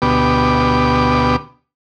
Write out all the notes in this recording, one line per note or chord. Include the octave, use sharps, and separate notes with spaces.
D2 B2 B3 G4 D6